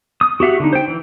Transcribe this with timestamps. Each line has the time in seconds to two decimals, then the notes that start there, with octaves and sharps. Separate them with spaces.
0.21 D#6
0.40 F#4 G4 E5 F#5
0.60 D3 D#4
0.73 C5 G5
0.88 E3